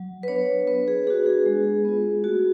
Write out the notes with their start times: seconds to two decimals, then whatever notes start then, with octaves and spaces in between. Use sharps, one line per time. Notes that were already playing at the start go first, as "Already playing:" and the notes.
Already playing: F#3
0.23 B4
0.28 B3 D4 C#5
0.67 B3 B4
0.88 G#4
1.07 D4 F#4 G#4
1.26 G#4
1.46 G#3
1.85 B3 F4
2.24 A3 F#4